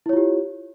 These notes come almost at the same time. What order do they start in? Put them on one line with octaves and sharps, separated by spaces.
E4 C#5 F4 G4